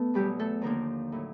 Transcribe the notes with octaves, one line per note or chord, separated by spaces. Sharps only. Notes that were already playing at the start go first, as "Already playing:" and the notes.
Already playing: A3 B3 A4 B4
E2 B2 F#3 G3 G4
A3 A4
D#2 D3 F3 A#3 A#4
A2 F#3